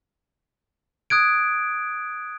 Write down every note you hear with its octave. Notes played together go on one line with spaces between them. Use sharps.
D#6 F#6 G#6 D7